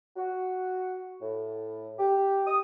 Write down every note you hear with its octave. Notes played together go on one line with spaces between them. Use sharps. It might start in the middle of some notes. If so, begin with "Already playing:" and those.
F#4
A2
G4
D#6